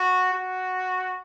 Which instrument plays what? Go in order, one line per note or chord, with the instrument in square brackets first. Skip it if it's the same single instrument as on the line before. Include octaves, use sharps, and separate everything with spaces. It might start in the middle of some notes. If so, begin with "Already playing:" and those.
Already playing: [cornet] F#4
F#4